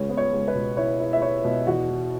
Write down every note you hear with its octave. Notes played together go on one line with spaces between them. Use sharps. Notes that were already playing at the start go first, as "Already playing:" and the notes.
Already playing: C#2 C#5
B3
C#5
C#2
B4
B2
E4 C#5
E4
E5
E4 C#5
B2
E2 F#4
E3